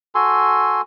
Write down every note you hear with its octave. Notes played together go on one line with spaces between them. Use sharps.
F#4 A4 G#5 C6